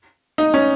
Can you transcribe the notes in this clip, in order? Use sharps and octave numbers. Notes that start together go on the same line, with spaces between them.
D#4
C#4